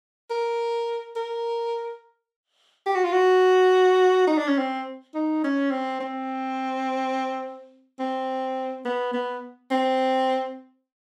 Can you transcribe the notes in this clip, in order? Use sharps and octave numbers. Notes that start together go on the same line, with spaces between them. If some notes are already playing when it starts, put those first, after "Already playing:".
A#4
A#4
G4
F#4
F4
F#4
D#4
D4
C#4
C4
D#4
C#4
C4
C4
C4
B3
B3
C4